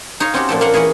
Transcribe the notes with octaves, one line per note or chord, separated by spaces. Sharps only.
D#4 C#5 F5
C4 C#4 D#4 F#4 G4
A#2 F3 A4
A#3 F5 F#5
E3 G#4 A#4 C#5 F#5